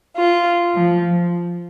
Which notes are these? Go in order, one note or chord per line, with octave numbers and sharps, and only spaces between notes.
F4
F3